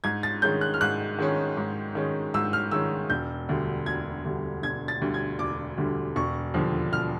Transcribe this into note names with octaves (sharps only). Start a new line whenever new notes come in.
G#2 G#6
A6
D#3 G#3 C#4 G6
F#6
F6
G#2 F#6
D#3 G#3 C#4
G#2
D#3 G#3 C#4
G#2 E6
F6
D#3 G#3 C#4 E6
E1 G6
D2 D3 G3
E1 G#6
D2 D3 G3
E1 G#6
A6
D2 D3 G3
G#6
E1 D6
D2 D3 G3
E1 C#6
D#2 D3 F3
E1 F6